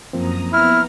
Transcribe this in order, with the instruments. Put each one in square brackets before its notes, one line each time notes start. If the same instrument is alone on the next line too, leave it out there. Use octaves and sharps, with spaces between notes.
[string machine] F#2 A#5 D#6 [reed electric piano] F3 A#3 C4
[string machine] B3 A#5 [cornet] E4 [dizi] F6